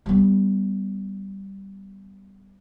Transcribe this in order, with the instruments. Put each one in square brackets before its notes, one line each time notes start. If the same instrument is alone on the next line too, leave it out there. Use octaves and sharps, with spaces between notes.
[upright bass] G3 B3